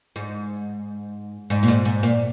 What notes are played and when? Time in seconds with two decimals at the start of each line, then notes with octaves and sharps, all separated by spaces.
0.16 G#2
1.50 G#2
1.63 A#2
1.68 G#2
1.85 G#2
2.03 A#2